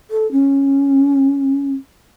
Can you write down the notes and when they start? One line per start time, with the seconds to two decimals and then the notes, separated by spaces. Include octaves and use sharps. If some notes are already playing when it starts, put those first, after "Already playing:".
0.11 A4
0.32 C#4